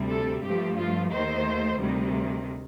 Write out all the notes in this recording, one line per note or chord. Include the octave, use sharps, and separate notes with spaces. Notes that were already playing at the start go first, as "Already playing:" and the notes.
Already playing: D2 C3 G3
A4
G2 F3 A3 G4
F4
D#2 D#3 A3 C5
D2 C3 D#3 G3